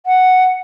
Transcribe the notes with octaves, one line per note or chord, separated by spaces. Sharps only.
F#5